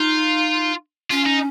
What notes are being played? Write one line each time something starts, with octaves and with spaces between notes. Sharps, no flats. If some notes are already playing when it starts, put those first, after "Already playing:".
Already playing: D#4 F4
C#4 F4
D#4